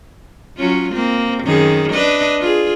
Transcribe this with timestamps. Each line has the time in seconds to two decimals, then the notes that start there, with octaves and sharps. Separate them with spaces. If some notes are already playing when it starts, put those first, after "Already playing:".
0.57 F#3 C#4 F4
0.92 A#3 C4
1.44 F#2 D#3 G#4
1.93 D4 B4 D#5
2.40 F4 G#4